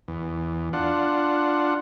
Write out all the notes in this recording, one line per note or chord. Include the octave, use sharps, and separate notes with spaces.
E2
D4 F4 F#5